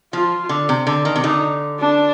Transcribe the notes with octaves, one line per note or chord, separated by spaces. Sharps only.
F3 F4
D3
C3
D3
D#3
C3
D3 D#4
D4